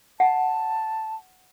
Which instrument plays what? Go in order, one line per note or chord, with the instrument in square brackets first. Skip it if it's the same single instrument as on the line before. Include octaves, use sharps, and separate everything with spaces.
[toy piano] F#5 [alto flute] A5